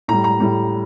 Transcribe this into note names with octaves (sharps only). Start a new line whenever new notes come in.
A2 G3 A#5
A#5
A2 G3